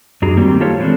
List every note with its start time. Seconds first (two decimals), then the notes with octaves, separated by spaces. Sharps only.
0.22 F#2 D4 F#4 G#4 A#5
0.37 D#3 G3 A#3 C4
0.60 F4 G4 A4 C5 C#5 F5
0.80 E3 F#3 G#3 A3 C4 D4